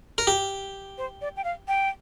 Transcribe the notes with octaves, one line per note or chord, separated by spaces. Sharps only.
A#4
G4
C5
D5
G5
F5
G5